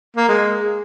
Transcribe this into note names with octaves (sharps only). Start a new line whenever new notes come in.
A#3
G#3